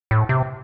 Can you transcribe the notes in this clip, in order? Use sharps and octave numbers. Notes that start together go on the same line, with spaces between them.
A2
C3